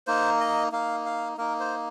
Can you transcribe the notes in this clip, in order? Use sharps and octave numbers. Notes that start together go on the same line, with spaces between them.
A#3 D#4 C5
D#5
A#3 D#4 F5
F5
A#3 D#4 A#4
C5